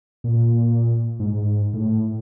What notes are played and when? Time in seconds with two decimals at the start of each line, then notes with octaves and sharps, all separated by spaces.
0.24 A#2
1.19 G#2
1.74 A2